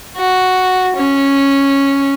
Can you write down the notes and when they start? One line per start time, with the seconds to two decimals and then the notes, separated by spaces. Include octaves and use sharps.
0.16 F#4
0.96 C#4